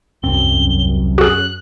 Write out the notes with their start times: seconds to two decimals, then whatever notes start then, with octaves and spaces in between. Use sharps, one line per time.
0.23 E1 C2 F#2 C4 G7
1.18 F#4 G#4 F#6